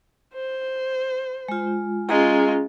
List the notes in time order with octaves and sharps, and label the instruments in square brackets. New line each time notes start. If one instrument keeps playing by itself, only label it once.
[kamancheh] C5
[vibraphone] G#3 F4
[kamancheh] G#3 F4 [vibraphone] C#4 G#4 A#5